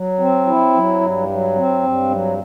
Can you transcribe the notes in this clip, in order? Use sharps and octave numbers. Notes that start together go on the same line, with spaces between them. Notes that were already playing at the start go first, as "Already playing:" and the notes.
Already playing: F#3
C4
E4
F#3
G2
F#3
C4
G2
F#3